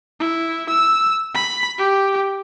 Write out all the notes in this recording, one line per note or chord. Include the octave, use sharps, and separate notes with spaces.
E4
E6
B5
G4